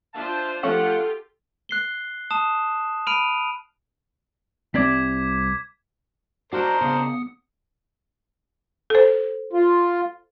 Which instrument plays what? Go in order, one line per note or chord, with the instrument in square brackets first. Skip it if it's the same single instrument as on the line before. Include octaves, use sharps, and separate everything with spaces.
[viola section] D4 F4 C5 [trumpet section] E5 F5 A5
[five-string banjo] F3 A3 C#4 [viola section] F4 G4 [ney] A4 [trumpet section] F#5
[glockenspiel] F#6 C7 G7
A5 D#6 E7
B5 F6 D7 D#7 F7
[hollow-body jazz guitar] C2 C4 D5 [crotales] D6 G#6 B6
[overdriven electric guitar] D4 D#4 [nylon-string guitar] F#4 [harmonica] A#4 C5 [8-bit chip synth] D5 C6 F#6
[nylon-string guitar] C#3 [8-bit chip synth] B3 D#6 C#7
[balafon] A4 C5
[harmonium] F4